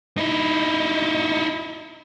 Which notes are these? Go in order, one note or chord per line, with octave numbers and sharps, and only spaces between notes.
D#4 E4